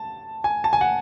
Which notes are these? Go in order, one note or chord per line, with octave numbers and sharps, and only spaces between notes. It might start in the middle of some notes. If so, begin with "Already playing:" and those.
Already playing: A5
G#5
A5
G#5
F#5